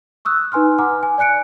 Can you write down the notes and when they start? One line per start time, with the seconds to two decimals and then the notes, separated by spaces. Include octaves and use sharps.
0.25 C#6 D#6 E6 F#6
0.52 D#4 B4 G#5 C6 F6
0.79 F#5 G#5 A#5 D6 F6
1.03 G#5
1.18 D5 G#5 F#6 C#7 D7